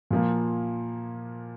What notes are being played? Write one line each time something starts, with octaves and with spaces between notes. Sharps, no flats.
A#2 F3 A#3